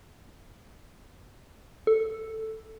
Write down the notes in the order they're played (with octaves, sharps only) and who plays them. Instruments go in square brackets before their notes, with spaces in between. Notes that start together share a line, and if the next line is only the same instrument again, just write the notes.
[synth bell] A4